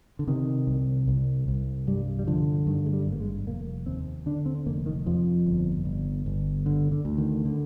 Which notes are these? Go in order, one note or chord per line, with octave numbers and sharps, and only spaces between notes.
D3
C3 D#3
C2
C2
C2
G2 G3
G3
D3 F3
G2 D#3
G#3
G3
G#1
A#3
G#3
F1 A#3
D#2 C4
D3 D4
C4
F1 A#3
D#3
F2 F3
G1
G1
G1
D3
D3
D2
D#3
D3